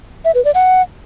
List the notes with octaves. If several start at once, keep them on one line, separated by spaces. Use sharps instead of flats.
E5
B4
D5
F#5